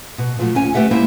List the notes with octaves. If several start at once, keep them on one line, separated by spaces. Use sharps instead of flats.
B2
A#2 F3 F#3 A3
D2 C#4 G#5
A3 G4 B4 E5 F#5
G3 G#3 A#3 E4 C5